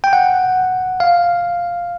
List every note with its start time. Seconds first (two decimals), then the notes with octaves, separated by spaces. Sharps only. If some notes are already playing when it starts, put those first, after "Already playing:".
0.04 G5
0.13 F#5
1.00 F5